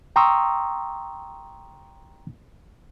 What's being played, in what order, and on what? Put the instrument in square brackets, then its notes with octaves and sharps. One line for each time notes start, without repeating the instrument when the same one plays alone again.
[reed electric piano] G5 A#5 C6 C#6 D#6 E6